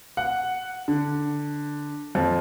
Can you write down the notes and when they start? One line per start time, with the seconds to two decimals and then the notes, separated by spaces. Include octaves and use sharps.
0.17 F#5
0.88 D3
2.15 F2